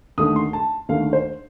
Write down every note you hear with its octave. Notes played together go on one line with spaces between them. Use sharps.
D#2 D3 A3 D#6
C6
A5
D#2 D3 A3 F5
C5